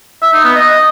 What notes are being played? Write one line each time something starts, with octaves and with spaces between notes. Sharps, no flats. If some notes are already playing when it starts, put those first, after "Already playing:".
E5
D#4
B3
D#5